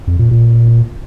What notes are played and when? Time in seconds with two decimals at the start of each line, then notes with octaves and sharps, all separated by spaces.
0.07 F2
0.19 A#2
0.31 A#2